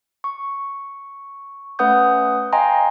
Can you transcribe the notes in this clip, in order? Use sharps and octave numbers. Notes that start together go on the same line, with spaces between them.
C#6
A3 C#4 B4 F#5 D#6 G6
D#5 F5 G5 G#5 A#5 C6